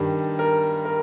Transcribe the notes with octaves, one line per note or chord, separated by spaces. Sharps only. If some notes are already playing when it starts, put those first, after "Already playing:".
Already playing: G2 D#3 G3
A#4
A#4